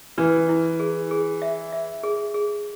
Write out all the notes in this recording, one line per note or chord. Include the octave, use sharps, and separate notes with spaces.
E3 B4
E4
G#4
G#4
E5
E5
G#4
G#4